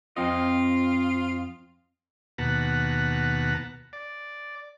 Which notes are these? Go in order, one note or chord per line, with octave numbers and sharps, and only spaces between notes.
F2 C4 F4 D#5
D#2 B2 B4 F#5 A5 A#5
D5